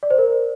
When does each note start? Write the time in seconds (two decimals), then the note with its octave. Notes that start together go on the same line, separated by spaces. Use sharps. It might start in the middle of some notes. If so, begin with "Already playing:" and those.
0.03 D5
0.10 C5
0.18 A#4